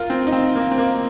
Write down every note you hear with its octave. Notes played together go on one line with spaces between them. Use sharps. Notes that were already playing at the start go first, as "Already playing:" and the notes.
Already playing: F4 A#4
C4
D#4
C4
A#3
C4
A#3